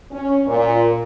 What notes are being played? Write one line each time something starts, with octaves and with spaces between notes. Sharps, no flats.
C#4
A#2